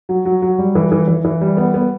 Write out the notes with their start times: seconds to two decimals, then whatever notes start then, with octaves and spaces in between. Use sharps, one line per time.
0.09 F#3
0.25 F#3
0.42 F#3
0.58 G3
0.75 E3
0.92 E3
1.08 E3
1.25 E3
1.41 G3
1.57 B3
1.74 B3